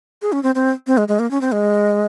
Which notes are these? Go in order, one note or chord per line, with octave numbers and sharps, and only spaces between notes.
G#4
C#4
C4
C4
C4
G#3
G#3
A#3
C#4
C4
G#3